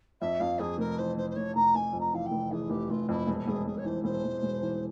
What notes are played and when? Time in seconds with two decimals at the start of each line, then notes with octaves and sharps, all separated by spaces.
0.20 F2 E5
0.40 F2 F5
0.59 F2 G#4
0.78 F1 A#4
0.98 E3 C5
1.16 F1 C5
1.30 C5
1.36 F1 C#5
1.55 F1 A#5
1.75 F1 G#5
1.93 F2
2.00 A#5
2.13 E3 F5
2.26 G5
2.31 F1
2.51 E3 G#4
2.70 F1 G4
2.90 F1 F4
3.09 F2 E4
3.27 E1
3.47 E1 G#4
3.67 E1 G#4
3.77 C#5
3.85 E3 C5
4.04 E1 C5
4.24 E1
4.43 E1
4.62 E3